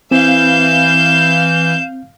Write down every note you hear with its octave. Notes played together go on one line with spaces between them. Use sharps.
E3 C4 F5 G6 E7